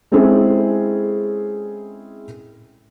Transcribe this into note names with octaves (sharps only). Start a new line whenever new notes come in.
G#3 C4 C#4 E4 G#4 A4